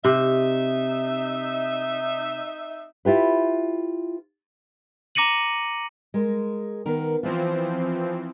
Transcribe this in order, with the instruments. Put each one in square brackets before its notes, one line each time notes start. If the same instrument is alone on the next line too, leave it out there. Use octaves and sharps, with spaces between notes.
[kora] C3 [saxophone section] D#4 E5
[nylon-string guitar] E4 F4 G4 B4
[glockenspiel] A#5 D6 A#6 C#7 D#7 F#7
[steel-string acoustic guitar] G#3 A#4
D#3 B3 A#4
[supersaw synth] E3 F3 C4 [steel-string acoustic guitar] F4 C5